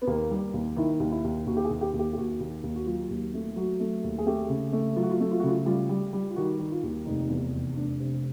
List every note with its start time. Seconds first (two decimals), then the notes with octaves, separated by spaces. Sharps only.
0.02 B3
0.07 D#2 A#3
0.31 G3
0.54 D#2
0.76 D#3 E4
1.00 D#2
1.11 E4
1.24 D#2
1.47 D#2 F#4
1.57 G4
1.65 G#4
1.70 D#2
1.81 G4
1.93 D#2
1.99 G4
2.13 G4
2.17 D#2 F#4
2.40 D#2
2.63 D#2
2.76 F#4
2.87 F#3 F4
3.10 D#2
3.34 A3
3.56 F#3 F#4
3.80 A3
4.04 D#2
4.18 G#4
4.26 A3 G4
4.49 C#3
4.73 A3
4.96 F#3 F4
5.03 F#4
5.10 F4
5.20 A3
5.31 F4
5.40 F#4
5.43 C#3 F4
5.66 G3 F4
5.89 G3
6.13 G3
6.30 F4
6.36 D#3 F#4
6.59 D#3
6.72 F4
6.83 D#2
7.06 F1 D#4
7.29 E2
7.53 F1
7.76 F1 D4
8.00 C3